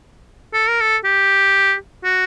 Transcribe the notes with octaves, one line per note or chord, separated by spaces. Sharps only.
A4
A#4
A4
G4
F#4